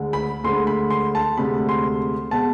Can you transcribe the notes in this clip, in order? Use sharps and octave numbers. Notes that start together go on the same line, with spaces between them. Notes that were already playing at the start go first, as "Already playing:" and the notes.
Already playing: D2 D3 G#3
B5
D2 D3 G#3 C6
B5
C6
A5
D2 C3 G#3 B5
C6
B2 G#3 A5